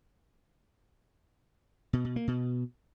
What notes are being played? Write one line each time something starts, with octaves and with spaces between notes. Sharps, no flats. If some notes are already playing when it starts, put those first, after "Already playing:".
B2
B2
A#3
B2